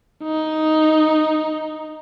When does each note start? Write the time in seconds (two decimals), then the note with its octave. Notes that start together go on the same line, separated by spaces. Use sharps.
0.23 D#4